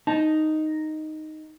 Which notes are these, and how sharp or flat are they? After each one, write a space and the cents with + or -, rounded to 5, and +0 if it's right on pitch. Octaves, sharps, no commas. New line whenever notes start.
D#4 +0 A5 +0